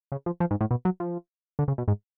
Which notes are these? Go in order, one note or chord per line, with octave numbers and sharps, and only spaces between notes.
C#3
F3
F3
G#2
A2
B2
F#3
F3
D3
C#3
B2
G#2